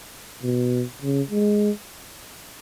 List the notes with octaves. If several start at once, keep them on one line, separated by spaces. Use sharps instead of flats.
B2
C#3
G#3